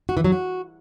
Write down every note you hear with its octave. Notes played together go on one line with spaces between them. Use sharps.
F#4
E3
F#3
F#4